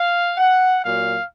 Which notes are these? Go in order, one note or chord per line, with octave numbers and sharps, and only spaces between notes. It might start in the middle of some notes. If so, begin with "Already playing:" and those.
Already playing: F5
F#5
A#2 F#3 F5